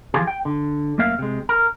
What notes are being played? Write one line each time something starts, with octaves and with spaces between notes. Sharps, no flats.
E3 F3 F4 G4 G#4
G5
D3
F#2 A3 A#3 E5 F5
C3 G#3
A#4